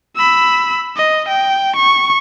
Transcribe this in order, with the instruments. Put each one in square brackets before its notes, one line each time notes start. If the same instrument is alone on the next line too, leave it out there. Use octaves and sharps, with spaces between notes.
[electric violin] B5 E6
D#5
G5
C#6